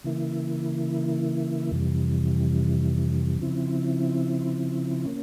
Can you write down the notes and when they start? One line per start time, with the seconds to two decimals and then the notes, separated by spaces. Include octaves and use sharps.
0.04 C#3 E3 A#3 E4
1.71 F2 C3 E3 G3
3.39 C#3 F3 C4 E4
5.06 A#3 C#4